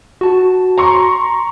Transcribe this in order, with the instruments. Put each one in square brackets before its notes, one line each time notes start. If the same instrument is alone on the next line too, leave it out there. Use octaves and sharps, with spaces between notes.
[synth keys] F#4 A5
[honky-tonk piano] A#5 C6 C#6